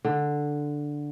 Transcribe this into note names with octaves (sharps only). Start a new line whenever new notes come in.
D3